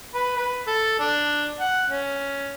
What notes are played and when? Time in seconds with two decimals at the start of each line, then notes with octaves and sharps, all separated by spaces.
0.15 B4
0.37 B4
0.67 A4
0.99 D4
1.60 F#5
1.90 C#4